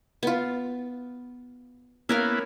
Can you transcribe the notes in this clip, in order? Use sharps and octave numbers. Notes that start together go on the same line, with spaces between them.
B3 F4
A#3 B3 C#4 E4 A#4 F5